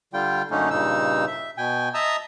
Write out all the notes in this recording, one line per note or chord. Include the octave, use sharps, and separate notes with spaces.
D3 G3 F4 G5
F#2 D3 A3 A#3 C#4 D#4
G2 A#2 C#3 D#4 E6
E5
B2 G5 G#5
D#5 E5 A5 A#5 D#6 E6